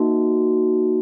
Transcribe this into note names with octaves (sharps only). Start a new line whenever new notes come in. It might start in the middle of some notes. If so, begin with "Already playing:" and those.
Already playing: A#3 D#4 F#4